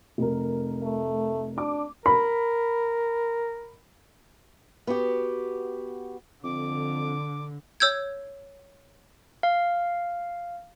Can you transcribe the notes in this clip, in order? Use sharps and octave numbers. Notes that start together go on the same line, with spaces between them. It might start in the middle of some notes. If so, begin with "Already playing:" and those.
F1 A#4
A3
D4 D6
A#4 B5
B3 F#4 G4
F2 D3 D6
C#5 E6 G6 G#6
F5